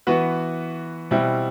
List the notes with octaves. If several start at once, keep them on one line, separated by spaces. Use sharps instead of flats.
E3 B3 F#4 B4
B2 G3 C4 E4